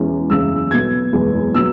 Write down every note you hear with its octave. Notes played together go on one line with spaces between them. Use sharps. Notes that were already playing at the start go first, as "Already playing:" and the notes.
Already playing: E1 E2 E3 G#3 C#4
F#1 E2 C#3 E3 E6
B1 B2 B3 G#6
F#1 E2 B2 G#3 B3
B2 F#3 E6